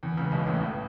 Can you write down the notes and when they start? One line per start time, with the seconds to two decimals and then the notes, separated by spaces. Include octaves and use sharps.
0.03 E2 E3
0.17 C#2 C#3
0.32 B1 B2
0.46 A1 A2
0.61 A1 A2